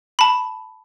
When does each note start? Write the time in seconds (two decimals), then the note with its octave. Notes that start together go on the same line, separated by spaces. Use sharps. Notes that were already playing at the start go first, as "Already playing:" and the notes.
0.19 A5 B5